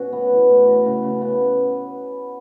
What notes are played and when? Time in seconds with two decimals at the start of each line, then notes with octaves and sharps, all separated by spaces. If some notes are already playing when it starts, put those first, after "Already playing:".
Already playing: B2 C#4 F#4
0.13 B3
0.31 E3
0.49 A2
0.67 F#4
0.85 C#3
1.03 C#3
1.22 B3